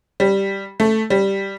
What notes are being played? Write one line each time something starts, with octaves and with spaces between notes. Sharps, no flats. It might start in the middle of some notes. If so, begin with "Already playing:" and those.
G3
A3
G3